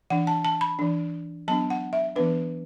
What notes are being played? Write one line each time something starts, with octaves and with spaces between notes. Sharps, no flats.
E3 D4 F#5
A5
A5
B5
E3 D4
F#3 B3 D4 A5
F#5
E5
E3 B3 D4 B4